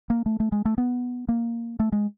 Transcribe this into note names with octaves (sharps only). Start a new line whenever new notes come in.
A#3
A3
A3
G#3
A3
B3
A#3
A3
G#3